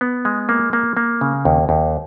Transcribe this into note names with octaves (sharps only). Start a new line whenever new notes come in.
B3
G#3
A#3
A#3
A#3
C#3
D#2
D#2